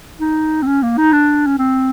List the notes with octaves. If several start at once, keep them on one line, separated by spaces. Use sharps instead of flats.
D#4
C4
C#4
A#3
D#4
D4
C#4
C4